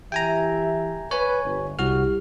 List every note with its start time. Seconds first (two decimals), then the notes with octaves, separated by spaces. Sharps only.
0.12 E3 G4 E5 G5 G#5 A#5
1.11 B4 C#5 G#5
1.45 G1
1.79 C2 G3 E4 F#4 G4 F6